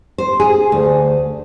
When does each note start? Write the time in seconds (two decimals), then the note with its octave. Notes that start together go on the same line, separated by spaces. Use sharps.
0.18 C5
0.40 G#4
0.72 D2